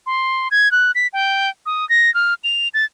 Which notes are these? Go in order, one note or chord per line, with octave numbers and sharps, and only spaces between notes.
C6
G#6
F#6
B6
G5
D#6
A#6
F6
F7
A6